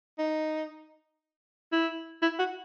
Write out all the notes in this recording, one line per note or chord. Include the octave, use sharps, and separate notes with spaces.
D#4
E4
E4
F#4